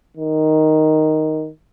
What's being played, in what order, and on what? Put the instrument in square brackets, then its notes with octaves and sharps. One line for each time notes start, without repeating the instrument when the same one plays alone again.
[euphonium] D#3